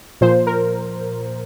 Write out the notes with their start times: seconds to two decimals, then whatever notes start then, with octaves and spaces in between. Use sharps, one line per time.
0.21 A#2 F3 C5
0.47 A#4